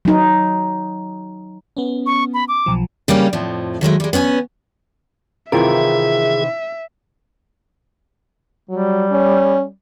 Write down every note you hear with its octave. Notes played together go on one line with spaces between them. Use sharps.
F#3 D#4
B3 C#4
C#6
B5
D6
B1 F3
C#3 G3 A#3 C#4
F2 A2 F3
D#3 F#3 G#3 A3
G3 G#3
B3 C#4 G#4 G#5
C3 D#3 E3 E4 F4 G#4 A#4 E5
F#3 G3
C#4